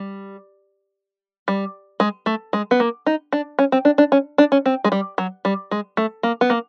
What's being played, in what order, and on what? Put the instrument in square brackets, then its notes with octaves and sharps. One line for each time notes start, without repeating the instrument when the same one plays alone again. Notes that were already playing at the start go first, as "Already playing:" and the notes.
Already playing: [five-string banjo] G3
G3
G#3
A3
G#3
B3
A#3
D#4
D4
C#4
C4
D4
D4
C#4
D4
C#4
C4
G#3
G3
F#3
G3
G#3
A3
A#3
B3
A#3